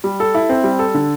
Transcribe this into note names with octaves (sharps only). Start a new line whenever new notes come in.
G3
A4
E4
C4
G3
A4
D3